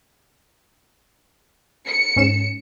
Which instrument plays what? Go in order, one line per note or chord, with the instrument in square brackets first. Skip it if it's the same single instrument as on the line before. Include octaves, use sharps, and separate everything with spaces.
[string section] C#7
[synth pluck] G#2 C#4 E7